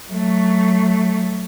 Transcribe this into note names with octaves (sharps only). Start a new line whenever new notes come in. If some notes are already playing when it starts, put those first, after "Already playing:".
F#3 A3